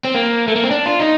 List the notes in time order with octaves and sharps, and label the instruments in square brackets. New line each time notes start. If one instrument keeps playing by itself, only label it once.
[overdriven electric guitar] C4
A#3
A3
A#3
C4
D4
F4
D#4